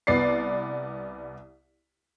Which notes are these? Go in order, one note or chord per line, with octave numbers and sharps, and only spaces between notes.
C2 B3 D5 C7